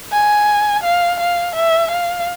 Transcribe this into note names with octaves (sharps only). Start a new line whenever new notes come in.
G#5
F5
F5
E5
F5